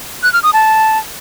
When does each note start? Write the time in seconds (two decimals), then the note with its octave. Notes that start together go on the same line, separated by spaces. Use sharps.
0.23 F#6
0.33 F6
0.43 D#6
0.53 A5